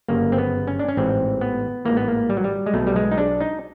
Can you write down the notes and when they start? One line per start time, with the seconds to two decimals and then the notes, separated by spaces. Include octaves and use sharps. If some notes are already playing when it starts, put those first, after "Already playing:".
0.08 G1 F#2 C#3 A#3
0.32 C4
0.38 B3
0.67 C#4
0.79 D4
0.88 C#4
0.97 A1 G#2 E3 C4
1.41 B3
1.85 A1 G#2 E3 A#3
1.97 B3
2.08 A#3
2.30 G3
2.37 F#3
2.44 G3
2.66 G#3
2.74 B1 B2 A3
2.87 G3
2.96 G#3
3.11 D#4
3.18 D4
3.41 D#4